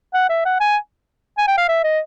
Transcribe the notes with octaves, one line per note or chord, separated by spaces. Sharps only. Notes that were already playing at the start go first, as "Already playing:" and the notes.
F#5
E5
F#5
G#5
G#5
G5
F5
E5
D#5